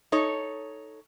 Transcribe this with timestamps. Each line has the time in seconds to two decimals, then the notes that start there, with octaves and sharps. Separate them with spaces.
0.12 D#4 A4 C#5